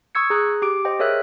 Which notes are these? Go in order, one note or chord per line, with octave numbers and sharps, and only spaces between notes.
C#6 D#6 E6 G#6 C#7
G#4 A#5 D#6 F#6
G4 D6 D7
C5 D#5 G5
G#4 A#4 C#5 E5 E6 F#6